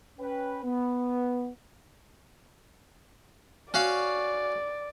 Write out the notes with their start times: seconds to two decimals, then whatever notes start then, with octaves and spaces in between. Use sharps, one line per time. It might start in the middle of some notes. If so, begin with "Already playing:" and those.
0.19 C#4 B4 G5
0.64 B3
3.74 C#4 F#4 D5 F5